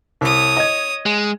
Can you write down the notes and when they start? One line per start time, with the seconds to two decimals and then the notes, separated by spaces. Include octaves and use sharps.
0.21 C2 C#5 D#6
0.57 D#5 G#6
1.06 G#3